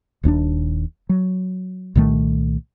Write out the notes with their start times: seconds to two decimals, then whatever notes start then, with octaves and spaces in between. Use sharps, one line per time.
0.23 D#1 D#2 C#4 D4
1.09 F#3
1.95 C2 A#2 D#3 A3